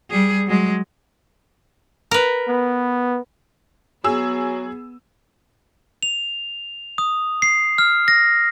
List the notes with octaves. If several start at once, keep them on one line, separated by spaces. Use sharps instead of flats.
G3 G#4
F#3 G#3
A#4 B4
B3
F#3 B3 G#4 E6
F7
D#6
C7
F6
A#6